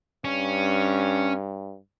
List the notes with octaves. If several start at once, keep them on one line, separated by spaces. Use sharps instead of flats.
G2 C#4